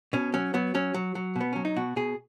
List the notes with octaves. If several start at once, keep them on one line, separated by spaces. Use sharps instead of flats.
B2 C#4
F#3 C#4
F#3 B3
F#3 C#4
F#3
F#3
B2 B3
F#3 C#4
D#4
B2 F#4
B2 G#4